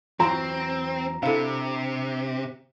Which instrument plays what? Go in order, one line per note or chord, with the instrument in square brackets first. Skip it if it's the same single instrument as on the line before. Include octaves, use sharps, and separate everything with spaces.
[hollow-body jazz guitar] E2 E3 F#3 [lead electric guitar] C4 [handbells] F4 [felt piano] A#5
[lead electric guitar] C3 [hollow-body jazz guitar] D4 E4 [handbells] A4 F5